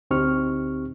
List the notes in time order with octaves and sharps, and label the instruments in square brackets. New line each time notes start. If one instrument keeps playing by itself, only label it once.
[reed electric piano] D2 C4 D#4 G4 C#6 F6